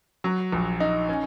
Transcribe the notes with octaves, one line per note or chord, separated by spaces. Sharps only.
F#3
A#1
D#4
C#4